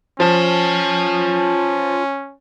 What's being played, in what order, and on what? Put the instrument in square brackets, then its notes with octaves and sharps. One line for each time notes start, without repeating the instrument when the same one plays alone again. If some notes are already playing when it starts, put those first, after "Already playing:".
[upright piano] F3 [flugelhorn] C#4 [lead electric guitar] F4 A5